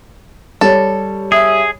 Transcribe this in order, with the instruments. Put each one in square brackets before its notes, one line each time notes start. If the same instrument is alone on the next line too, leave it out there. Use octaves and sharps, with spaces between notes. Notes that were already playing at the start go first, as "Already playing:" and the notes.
[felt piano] G3 C#5 [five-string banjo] A4
[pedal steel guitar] G#4 [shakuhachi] E5